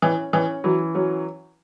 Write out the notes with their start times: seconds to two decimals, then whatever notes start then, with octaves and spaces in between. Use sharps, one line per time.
0.02 E3 C#4
0.33 E3 C#4
0.64 E3 F#3
0.95 F#3 C#4